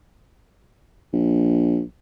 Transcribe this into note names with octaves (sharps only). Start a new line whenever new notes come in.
A#1